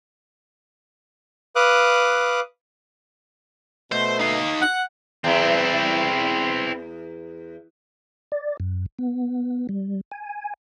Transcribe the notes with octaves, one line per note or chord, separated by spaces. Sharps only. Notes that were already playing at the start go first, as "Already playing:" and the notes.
B4 F5 D6 D#6 F#6
B2 A3 C5
D#4 F5
F#5
E2 C4 E4
D5
F#2
B3
G3
G#5